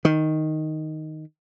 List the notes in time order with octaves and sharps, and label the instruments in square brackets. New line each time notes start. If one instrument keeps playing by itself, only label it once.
[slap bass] D#3